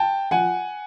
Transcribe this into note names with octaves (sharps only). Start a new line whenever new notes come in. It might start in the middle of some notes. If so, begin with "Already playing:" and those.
Already playing: G5 A5
F3 F#5 G#5